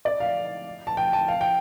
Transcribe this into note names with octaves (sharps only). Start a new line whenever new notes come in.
D5
F5
A5
G5
A5
F5
G5